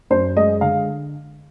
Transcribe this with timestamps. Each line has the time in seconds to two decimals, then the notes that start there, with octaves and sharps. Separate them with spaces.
0.10 F#2 C5
0.36 G#3 D#5
0.61 D3 F5